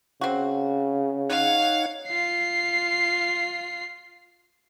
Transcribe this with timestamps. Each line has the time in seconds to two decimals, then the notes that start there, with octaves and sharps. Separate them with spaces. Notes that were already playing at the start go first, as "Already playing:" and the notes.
0.21 C#3 C4 F#4
1.29 D#4 C#5 F5 F#5
2.08 F4 C7